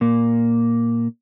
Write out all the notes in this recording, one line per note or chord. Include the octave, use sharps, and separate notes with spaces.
A#2 A#3